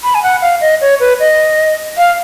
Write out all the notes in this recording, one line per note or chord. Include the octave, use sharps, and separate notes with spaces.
B5
G#5
F#5
F5
D#5
C#5
B4
D#5
F5